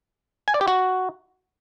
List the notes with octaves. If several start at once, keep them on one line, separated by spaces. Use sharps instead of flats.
G#5
D5
G4
F#4